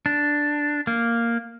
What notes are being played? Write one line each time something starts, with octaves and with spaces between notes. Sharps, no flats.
D4
A#3